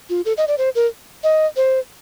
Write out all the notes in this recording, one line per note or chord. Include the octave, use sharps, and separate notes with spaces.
F4
A4
D#5
D5
C5
A#4
D#5
C5